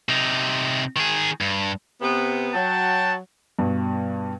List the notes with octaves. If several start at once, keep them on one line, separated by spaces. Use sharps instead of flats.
C3 D#4
D#3 G#4
G2
C3 B3
F#3 F#4 G5 A5
G2 B2